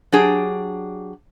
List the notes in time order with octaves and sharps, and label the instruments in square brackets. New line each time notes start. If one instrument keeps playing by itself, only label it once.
[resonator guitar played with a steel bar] F#3 D4 G4 G#4